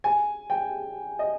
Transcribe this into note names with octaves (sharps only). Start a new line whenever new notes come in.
G#5
G5
D#5